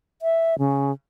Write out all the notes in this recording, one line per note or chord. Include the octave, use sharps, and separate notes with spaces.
E5
C#3